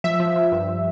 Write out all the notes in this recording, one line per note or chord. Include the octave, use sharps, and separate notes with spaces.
F3 E5
F3
F3
G2